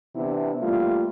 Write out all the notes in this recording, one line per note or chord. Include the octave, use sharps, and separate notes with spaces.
C3 E3 B3 D4 E4
G3 A3 A#3 F4